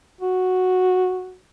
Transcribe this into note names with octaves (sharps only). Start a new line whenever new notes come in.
F#4